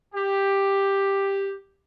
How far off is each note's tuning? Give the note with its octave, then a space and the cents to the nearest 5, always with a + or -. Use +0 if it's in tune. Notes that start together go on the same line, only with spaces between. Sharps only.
G4 +5